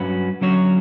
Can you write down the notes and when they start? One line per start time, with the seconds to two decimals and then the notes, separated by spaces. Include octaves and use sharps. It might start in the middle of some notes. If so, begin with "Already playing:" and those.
Already playing: G2 F#3 C#4 F#4 B4
0.41 D3 F#3 C#4 F#4 C#5